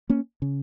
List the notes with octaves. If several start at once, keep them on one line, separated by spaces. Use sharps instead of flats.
A#3 C#4
C#3